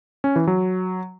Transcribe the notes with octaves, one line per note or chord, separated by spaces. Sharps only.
C#4
E3
F#3